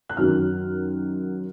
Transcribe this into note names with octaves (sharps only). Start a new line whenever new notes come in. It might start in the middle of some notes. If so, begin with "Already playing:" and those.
F#6
F#2 D#3 F#3 F6